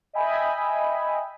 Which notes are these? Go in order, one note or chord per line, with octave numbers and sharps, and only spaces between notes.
D#5 E5 G5 G#5 B5